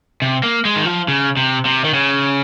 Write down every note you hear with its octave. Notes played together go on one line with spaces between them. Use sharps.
C3
A#3
G#3
D#3
F3
C#3
C3
C3
D#3
C#3